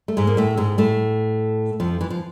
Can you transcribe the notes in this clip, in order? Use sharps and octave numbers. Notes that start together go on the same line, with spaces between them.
A3
G#2 G#3
A#3
A2 A3
G#2 G#3
A2 A3
F2 F3
E3
F3